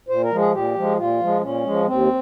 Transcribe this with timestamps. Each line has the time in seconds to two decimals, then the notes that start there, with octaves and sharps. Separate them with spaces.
0.08 A#2 C5
0.23 A#4
0.31 F3 G#3
0.38 G#4
0.52 A#2 G4
0.75 F3 G#3
0.97 A#2 F4
1.20 F3 G#3
1.42 A#2 C#4
1.64 F3 G#3
1.86 D#2 C4